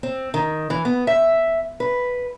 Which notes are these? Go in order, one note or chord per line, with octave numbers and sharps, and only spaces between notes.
C4
D#3
E3
B3
E5
B4